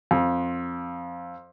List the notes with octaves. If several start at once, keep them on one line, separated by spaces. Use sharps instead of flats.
F2